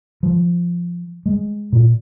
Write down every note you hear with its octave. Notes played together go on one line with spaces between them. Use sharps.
F3
G#3
A#2